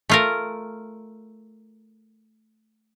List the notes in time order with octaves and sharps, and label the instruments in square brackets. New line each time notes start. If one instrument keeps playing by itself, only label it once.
[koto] A3 F4 A#4